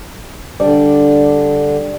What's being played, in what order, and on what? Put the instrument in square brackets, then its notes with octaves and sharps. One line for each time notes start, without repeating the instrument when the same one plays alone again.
[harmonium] D3 [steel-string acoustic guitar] G3 D4 D5